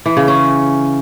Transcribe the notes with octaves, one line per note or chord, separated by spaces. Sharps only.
E3
C#3
C#4